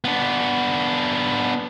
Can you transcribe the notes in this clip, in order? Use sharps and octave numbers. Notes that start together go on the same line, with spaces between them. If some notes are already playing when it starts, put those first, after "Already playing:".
B3 D4